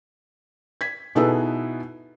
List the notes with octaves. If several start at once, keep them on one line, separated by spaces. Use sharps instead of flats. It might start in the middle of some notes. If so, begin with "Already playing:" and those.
G#6 B6
B2 D#4 E4 G#4 A4 B4